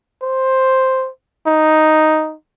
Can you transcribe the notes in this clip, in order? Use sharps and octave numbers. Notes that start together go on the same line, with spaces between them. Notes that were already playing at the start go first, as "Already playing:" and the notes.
C5
D#4